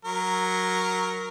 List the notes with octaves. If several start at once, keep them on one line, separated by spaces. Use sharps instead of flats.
F#3 A#4